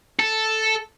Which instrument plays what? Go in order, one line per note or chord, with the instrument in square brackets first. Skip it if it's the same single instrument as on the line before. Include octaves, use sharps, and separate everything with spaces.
[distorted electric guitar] A4